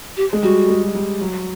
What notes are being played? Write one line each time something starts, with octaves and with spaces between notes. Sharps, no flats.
G4
G#3
G3 F#4
G#3
G3
F#3